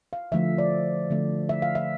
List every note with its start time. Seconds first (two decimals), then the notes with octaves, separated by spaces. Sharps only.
0.13 F5
0.32 D3 F3 A3 E5
0.58 D5
1.10 D3 F3 A3
1.49 E5
1.62 F5
1.75 E5